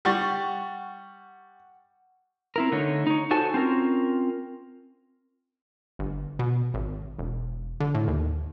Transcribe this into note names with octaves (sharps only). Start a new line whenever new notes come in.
G3 F#5 C#6 A6
C4 E4 A#4
D3 A3 D#4 C#5
D#4 C#5
D#4 F#4 A4 C5 G#5 A5
C4 C#4 F4 A#4
G1
B2
G#1
E1
D3
A2
D#2